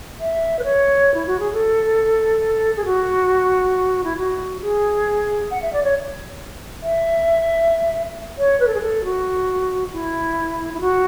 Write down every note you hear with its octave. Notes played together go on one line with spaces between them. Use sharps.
E5
B4
C#5
E4
F#4
G#4
A4
G#4
F#4
E4
F#4
G#4
F#5
E5
D5
C#5
E5
C#5
B4
A4
G#4
A4
F#4
E4
E4
F#4